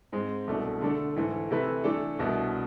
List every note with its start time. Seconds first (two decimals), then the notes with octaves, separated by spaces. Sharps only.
0.12 G#2 G#3 C4
0.47 C2 B2 A3 D4
0.81 D3 A3 D4 A4
1.16 G#2 E3 A3
1.51 C3 E3 A3 E4 B4
1.84 E3 A3 D4 A4
2.19 C2 B2 B3 D4